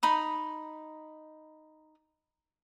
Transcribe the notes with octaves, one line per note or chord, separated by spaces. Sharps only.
D#4 B5 D#6